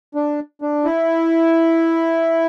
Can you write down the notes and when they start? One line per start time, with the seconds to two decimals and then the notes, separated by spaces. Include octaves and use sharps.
0.15 D4
0.62 D4
0.85 E4